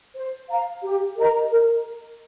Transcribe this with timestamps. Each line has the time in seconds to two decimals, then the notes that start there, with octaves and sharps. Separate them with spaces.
0.15 C5
0.49 F5 A#5
0.83 G4
1.16 A#4 D#5 A#5
1.51 A#4